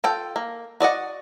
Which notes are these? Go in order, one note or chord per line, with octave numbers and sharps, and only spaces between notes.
F4 A4 G5
A#3
F#4 D5 D#5 F#5